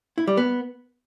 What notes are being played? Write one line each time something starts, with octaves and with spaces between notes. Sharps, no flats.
E4
G3
B3